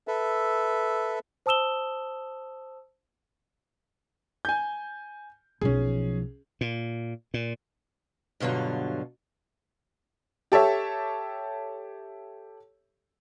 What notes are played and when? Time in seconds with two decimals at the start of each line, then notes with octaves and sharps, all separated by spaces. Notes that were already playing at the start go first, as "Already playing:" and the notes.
0.08 A4 B4 E5
1.46 C5 A5 D#6 E6 E7 G7
4.45 G#5 G6
5.61 B1 F3 C#4 G#4
6.61 A#2
7.34 A#2
8.40 G2 B2 D3 F#3 F4
10.52 G4 A4 C#5 E5